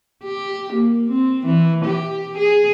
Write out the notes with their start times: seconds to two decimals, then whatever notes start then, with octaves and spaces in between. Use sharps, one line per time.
0.24 G4
0.73 A#3
1.10 C4
1.46 E3
1.85 G4
2.37 G#4